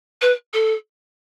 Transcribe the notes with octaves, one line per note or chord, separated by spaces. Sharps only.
B4
A4